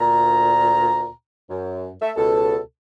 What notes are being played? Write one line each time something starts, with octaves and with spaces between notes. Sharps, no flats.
D2 A#2 A#5
F#2
A3 E5
C#2 B2 A4